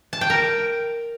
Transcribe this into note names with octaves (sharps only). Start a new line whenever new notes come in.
A5
G5
A#4